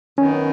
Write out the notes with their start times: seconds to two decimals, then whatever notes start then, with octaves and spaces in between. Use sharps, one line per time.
0.18 F#2 D#3 B3 C#4